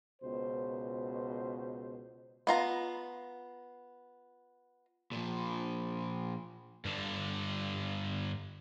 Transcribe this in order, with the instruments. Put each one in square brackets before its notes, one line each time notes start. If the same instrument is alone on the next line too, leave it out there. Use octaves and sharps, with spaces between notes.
[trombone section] C#2 B2 C5
[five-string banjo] B3 F4 A#5
[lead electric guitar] A#2 F3
[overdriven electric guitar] G2 D3